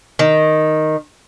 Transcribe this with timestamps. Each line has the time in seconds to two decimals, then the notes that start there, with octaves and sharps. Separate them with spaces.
0.19 D#3